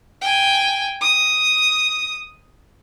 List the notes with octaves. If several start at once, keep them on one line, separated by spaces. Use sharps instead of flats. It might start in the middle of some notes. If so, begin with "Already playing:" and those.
G5 G#5
D#6